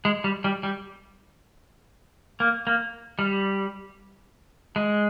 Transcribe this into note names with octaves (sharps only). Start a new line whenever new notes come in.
G#3
G3
G3
G3
A#3
A#3
G3
G#3